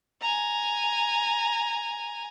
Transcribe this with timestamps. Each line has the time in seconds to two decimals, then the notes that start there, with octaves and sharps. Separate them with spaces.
0.21 G#5 A#5